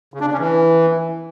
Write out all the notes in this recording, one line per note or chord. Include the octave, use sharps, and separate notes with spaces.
C#3
D4
C#3
C#4
E3